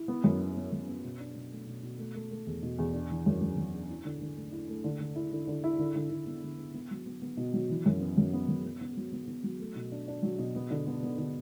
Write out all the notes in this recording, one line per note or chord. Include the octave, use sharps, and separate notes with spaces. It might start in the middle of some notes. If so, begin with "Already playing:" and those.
Already playing: E4
B3
F#2
B3
B3
F#2
B3
B2
D4
B2
A3
B2
B2
A3
A3
A3
E2
B2
E2
D4
E3
F#2
F#2
F#2
D4
E4
D3
D3
A3
E4
A3
D3
D3
E4
D3
D3
E4
D3
D3
D3
B3
D3
B3
B3
F#3
B3
B3
B2
F#3
E3
F#2
B3
F#2
B3
F#2
B3
B3
F#3
B3
B3
F#3
A3
B2
D4
D4
F#3
B2
B3
D3
B3
B3
D3